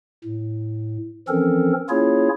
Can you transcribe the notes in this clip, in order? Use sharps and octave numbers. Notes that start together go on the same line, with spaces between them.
A2
E3 F3 C4 C#4 A4 A#4
A#3 C#4 E4 F4 G#4 C#5